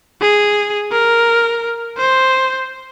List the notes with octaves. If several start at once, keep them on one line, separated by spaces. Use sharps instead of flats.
G#4
A#4
C5